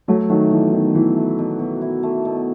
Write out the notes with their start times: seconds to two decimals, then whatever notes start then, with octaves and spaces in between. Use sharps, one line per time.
0.08 F#3 A3 E4
0.29 D#3 F#3 A3
0.51 B2 E3
0.73 B2 D#3
0.95 E3 E4
1.16 A3
1.38 B2
1.59 B2
1.81 E4
2.03 A3
2.25 B2